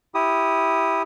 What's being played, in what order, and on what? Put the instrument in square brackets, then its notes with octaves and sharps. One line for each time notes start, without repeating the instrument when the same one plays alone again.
[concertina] E4 G4 D#6